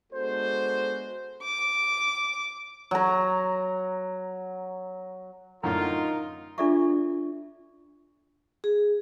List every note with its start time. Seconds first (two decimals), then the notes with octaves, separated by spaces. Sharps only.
0.13 G#3 B3 D4 F#4 A4 C5
1.43 D6
2.91 F#3 A#5
5.63 F#2 A2 D3 D#4 F4 A#4
6.58 D4 F4 A4 D5 E5 C#6
8.64 G#4